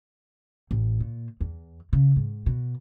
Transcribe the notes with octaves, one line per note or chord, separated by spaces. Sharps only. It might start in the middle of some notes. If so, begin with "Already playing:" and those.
A1
A#2
E2
C#3
G#2
B2